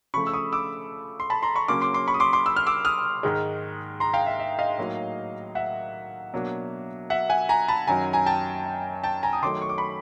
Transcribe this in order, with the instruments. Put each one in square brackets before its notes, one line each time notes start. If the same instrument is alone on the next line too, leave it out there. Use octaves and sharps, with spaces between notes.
[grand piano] C#3 F3 A3 B5 C#6
E6
C#6 D#6
D6 E6
C6
A5 B5
A#5 C6
B5 C#6
C#3 F#3 A#3 C#4 C6 D6
C6 D6
C6 D6
B5 C#6
D#6
C6 D6
C6 D6
E6
F6
D6 E6
D#6 F6
G#2 D#3 G#3
A#5 C6
F5 G5
E5
E5
D#5 F5
A2 F#3 A#3 D#4
E5 F#5
B2 F#3 A#3 D4
E5 F#5
F#5 G#5
G#5 A#5
A5 B5
F#2 D#3 F#3 G#5 A#5
G#5 A#5
G5 A5
G5 A5
G#5 A#5
D#6
D#3 F#3 A3 C6 D6
C#6
D6
B5 C#6